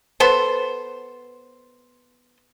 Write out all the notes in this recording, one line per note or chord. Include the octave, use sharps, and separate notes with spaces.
B3 A4 C5